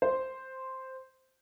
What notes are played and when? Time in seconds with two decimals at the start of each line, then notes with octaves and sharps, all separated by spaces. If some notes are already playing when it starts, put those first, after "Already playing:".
0.02 C5